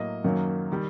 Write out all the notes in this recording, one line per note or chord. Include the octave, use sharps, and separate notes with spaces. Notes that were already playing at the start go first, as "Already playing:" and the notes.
Already playing: A2 F#3 A#3 D#5
F#2 D#3 F#3 A#3
D#3 G3